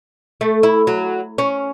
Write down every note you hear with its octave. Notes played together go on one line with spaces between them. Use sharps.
A3
E4
F#3
C#4